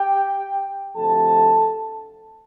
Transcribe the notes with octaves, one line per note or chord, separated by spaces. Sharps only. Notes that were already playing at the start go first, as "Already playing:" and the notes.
Already playing: G4 G5
D2 C3 F3 A4 A5